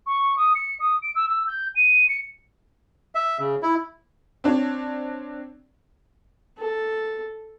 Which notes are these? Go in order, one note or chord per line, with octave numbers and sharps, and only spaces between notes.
C#6
D#6
C#7
D#6
D7
E6
E6
G6
D#7
C#7
E5
C#3
E4
C4 D4 C#5
A4